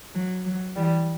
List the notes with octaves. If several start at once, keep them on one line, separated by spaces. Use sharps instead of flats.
F#3
F#3
E3 G3